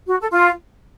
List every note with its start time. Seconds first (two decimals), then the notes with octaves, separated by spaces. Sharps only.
0.08 F#4
0.20 A4
0.31 F4